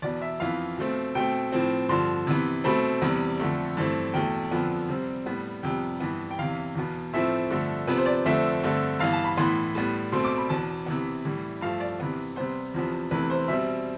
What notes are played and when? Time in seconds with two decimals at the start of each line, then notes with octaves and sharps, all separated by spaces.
0.02 E2 B2 B3 D5
0.22 E5
0.40 F2 E3 B3 F5
0.78 B2 A3 C4
1.15 B2 A3 C4 G5
1.52 A2 F3 C4
1.89 G2 D3 F3 C6
2.27 C3 E3 B3
2.64 B2 A3 C4 B5
3.02 E2 C3 G3 B3
3.39 F2 D3 A3
3.77 G2 E3 A3 C4
4.14 E2 B2 A3 G5
4.51 F2 D3 F3 B3
4.89 C3 G3 C4
5.26 A2 G3 B3
5.63 F2 C3 G3 B3 G5
6.00 G2 E3 B3
6.31 G5
6.39 E2 C3 E3 F5
6.75 E2 B2 B3
7.13 A2 F3 A3 C4 E5
7.50 G2 D3 F3 A3
7.87 C3 F3 B3 B4
7.98 C5
8.06 D5
8.26 F2 D3 A3 C4 E5
8.63 G2 D3 A3 C4
8.99 G2 E3 B3 F5
9.13 A5
9.24 B5
9.37 A2 E3 B3 C6
9.75 A2 G3 B3
10.12 B2 A3 C4 C6
10.25 D6
10.38 B5
10.49 E2 B2 B3 A5
10.86 C3 E3 B3
11.25 A2 E3 G3
11.61 G2 F3 A3 F5
11.80 D5
12.00 C3 E3 B3
12.36 C3 G3 B3 C5
12.74 E2 C3 F3 B3
13.11 E2 C3 E3 A3 B4
13.30 C5
13.48 B2 G3 C4 E5